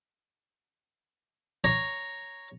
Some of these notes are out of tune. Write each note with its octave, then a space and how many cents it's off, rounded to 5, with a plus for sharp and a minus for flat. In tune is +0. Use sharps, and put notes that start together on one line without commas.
C#5 +0 A#5 +0